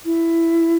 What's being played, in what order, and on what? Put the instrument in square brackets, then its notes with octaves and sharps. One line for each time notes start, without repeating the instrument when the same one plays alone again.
[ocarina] E4